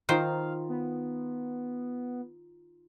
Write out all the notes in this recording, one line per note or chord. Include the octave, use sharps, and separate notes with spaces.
D#3 D#4 F4 C5 F5
B3